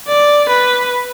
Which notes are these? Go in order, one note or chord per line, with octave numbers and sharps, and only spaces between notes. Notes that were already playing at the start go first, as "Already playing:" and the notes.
D5
B4